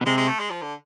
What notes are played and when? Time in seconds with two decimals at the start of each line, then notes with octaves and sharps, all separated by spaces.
0.01 B2
0.06 C3 G#3
0.17 G#3
0.28 A3
0.39 G#3
0.50 F3
0.62 D3